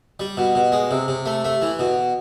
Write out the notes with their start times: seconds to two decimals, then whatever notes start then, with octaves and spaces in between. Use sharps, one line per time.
0.20 G3
0.37 B2
0.55 B2
0.72 G#3
0.91 C3
1.08 C3
1.26 A3
1.44 A3
1.62 E3
1.79 B2